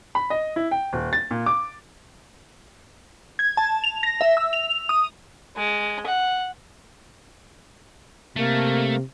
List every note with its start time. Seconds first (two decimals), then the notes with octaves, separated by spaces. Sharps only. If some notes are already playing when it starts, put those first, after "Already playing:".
0.15 B5
0.30 D#5
0.56 E4
0.71 G5
0.93 D#1
1.13 A6
1.31 A#2
1.46 D6
3.39 G#6
3.57 A5
3.84 F7
4.03 A#6
4.21 E5
4.37 E6
4.53 F7
4.89 D#6
5.57 G#3
6.06 F#5
8.36 C3 A3 A#3